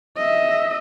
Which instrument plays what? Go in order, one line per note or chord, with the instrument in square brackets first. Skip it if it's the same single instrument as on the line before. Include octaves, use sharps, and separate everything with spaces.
[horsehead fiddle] D#5 E5